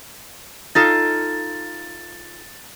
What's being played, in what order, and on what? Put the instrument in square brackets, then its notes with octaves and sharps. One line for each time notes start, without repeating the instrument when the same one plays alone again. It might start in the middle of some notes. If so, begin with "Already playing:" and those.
[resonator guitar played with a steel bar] D#4 F4 A4 [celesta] A6